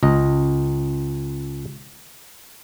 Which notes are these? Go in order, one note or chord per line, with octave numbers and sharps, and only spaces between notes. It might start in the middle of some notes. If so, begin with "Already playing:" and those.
C#2 D#5